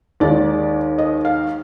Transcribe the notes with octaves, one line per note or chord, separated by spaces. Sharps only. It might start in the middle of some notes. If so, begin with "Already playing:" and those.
D#2 D#3 G#3 D5
D#5
F5